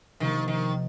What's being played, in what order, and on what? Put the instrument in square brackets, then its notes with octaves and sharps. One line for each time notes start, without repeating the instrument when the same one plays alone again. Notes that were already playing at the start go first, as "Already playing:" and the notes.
[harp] C3 F3 A#3 [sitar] D#3
[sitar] D#3